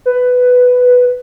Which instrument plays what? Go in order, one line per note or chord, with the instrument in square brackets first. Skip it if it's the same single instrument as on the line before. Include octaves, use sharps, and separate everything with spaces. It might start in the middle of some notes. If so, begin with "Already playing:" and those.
[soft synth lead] B4